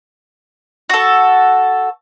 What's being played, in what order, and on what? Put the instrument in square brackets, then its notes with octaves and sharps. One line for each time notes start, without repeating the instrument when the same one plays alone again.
[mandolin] F#4 A4